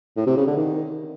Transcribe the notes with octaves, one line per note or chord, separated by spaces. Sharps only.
A2
C3
C#3
D3
D#3